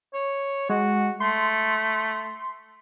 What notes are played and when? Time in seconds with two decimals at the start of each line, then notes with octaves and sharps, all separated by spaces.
0.14 C#5
0.69 G#3 F#4
1.20 A3 C6